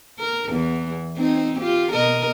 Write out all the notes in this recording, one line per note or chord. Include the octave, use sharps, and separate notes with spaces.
A#4
E2 E3
C4 D#4
F4 G4
B2 A#4 D#5